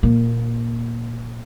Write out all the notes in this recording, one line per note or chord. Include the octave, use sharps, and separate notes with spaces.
A#2 A#3